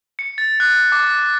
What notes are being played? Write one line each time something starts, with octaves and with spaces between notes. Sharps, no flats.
C#7
A6
F#6
D6